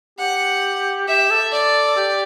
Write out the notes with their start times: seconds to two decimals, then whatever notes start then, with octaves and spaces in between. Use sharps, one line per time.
0.19 G4 F#5
1.08 G4 E5
1.30 A4
1.52 D5
1.97 G4